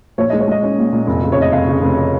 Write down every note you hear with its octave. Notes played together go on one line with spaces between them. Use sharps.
A#1 C#5
G#3 D#5
C#5
G#3 D#5
C#4
A#2
A#2
F1
C#3
C#5
F1 D#5
F1 F5
C#3
F1